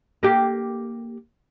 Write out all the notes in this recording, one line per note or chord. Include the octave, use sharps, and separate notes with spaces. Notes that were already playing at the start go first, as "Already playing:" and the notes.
A#3 G4